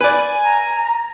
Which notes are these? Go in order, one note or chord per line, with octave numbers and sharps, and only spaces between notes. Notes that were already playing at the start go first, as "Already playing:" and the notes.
B4 D5 G#5
A#5